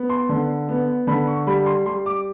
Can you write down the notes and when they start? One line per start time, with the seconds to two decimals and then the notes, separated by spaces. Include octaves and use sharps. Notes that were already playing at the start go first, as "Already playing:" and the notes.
Already playing: B3
0.10 C6
0.29 D3
0.68 B3
1.07 D3 B5
1.27 C#6
1.47 G3 B5
1.66 C6
1.86 G3 C6
2.06 D6